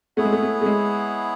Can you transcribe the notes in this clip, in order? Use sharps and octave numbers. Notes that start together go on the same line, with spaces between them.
A3 B3 E4 G#4 C#5 F#5
G#3
A3
A3
A3
G#3